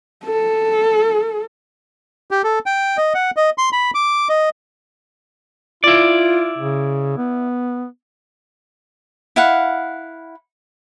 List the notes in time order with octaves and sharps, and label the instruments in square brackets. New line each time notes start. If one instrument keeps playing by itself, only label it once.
[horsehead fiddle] A4
[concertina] G4
A4
G5
D#5
F#5
D#5
C6
B5
D6
D#5
[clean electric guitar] E4 D5 [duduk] F4
[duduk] C#3
B3
[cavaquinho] E4 F5 F#5